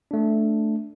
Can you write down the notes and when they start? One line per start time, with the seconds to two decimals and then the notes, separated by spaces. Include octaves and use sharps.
0.11 A3 D4